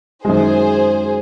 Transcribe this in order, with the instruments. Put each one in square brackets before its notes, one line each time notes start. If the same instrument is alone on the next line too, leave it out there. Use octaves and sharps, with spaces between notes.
[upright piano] F#2 D#3 G#3 [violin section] G#4 C5